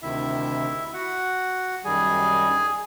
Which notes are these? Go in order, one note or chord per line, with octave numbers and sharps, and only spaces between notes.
D2 C3 D#3 E4 E5
F#4 F#5
F#2 D#3 G3 G#4 G#5